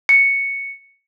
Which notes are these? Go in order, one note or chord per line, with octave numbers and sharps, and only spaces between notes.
C#7